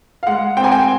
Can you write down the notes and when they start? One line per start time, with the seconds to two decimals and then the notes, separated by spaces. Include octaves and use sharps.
0.23 F5
0.27 G#3 F#5
0.57 C4 G5
0.64 G#5
0.72 G5